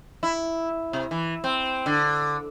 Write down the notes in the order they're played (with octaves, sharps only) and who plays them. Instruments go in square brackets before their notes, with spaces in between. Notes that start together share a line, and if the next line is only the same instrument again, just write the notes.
[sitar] E4
C3
E3
C4
D3